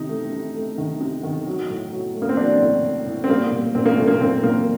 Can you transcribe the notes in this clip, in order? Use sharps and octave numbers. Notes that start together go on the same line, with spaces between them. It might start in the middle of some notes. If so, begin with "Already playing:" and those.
Already playing: C3 D#3 D#4
A3
C3
A3
D#3
C3
D#3
F#3
A2
F#3
A3
A#3
C4
F#3 D4
A2
A2
A2
C4
G3 A#3
A#2
A#2 C4
A#3
A#2 A3
A#3
A#2 C4
A#2 A#3